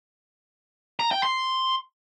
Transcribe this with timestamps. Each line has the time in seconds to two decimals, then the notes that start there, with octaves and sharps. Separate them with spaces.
1.00 A#5
1.11 G5
1.23 C6